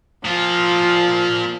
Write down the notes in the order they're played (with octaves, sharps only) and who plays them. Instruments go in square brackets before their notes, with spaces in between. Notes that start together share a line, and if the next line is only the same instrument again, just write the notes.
[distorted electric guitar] A#2 F4 [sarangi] F3